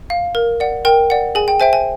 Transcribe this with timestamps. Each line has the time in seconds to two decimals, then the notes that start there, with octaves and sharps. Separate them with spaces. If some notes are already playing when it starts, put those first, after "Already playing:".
0.10 F5
0.35 A#4
0.60 D5 F#5
0.85 A#4 G5
1.10 D5 F#5
1.35 G#4 G#5
1.48 G5
1.60 C5 E5 G5 G#5
1.73 G#5